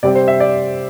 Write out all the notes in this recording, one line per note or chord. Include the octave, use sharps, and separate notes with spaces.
C3 G3 C4 D5
C5
E5
D5